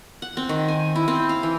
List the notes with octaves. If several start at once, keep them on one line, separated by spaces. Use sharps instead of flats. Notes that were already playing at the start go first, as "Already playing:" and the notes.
F#5
C4
D#3
G#5
E4
C4
F5
E3